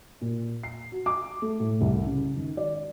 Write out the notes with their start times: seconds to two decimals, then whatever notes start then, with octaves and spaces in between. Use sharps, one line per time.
0.21 A#2
0.63 C7
0.92 F#4
1.06 D6
1.42 A3
1.60 A2
1.81 C2
2.06 C#3
2.35 G#1
2.57 D5